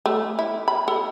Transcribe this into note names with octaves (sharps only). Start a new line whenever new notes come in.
A3
E4
B5
A4